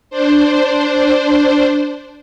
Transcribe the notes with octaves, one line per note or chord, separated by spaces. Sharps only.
D4 C5